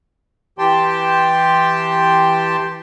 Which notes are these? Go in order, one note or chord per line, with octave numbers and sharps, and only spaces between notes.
E3 G4 G5 A5 C6